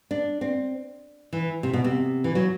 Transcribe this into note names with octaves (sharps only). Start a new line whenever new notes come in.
D4
C4
E3
C3
B2
C3
E3
F#3